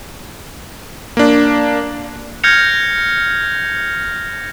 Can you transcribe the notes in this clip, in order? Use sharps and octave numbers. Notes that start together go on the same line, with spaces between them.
A#3 D4
F6 G6 G#6 A#6 C#7 F7